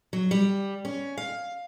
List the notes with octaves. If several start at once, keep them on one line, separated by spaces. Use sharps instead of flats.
F#3
G3
C#4
F5